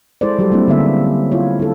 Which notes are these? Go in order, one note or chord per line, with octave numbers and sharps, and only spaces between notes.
G#3 E4 G#4 A4 C5 D5
F#3 G3 F#4 G4 A4
G3 G#3 A#3 C4 D4 E4
D3 A#3 B3 C#4 G#4 E5
E4 F4 C#5
E4 A4